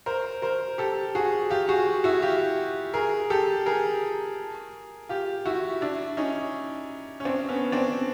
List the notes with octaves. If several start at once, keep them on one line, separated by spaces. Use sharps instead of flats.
A#4 C5
A#4 C5
G4 A4
F#4 G#4
F4 G4
F#4 G#4
E4 F#4
F4 G4
G#4 A#4
G4 A4
G#4 A#4
F4 G4
E4 F#4
D4 E4
C#4 D#4
C#4
C4 D4
B3 C#4
C4 D4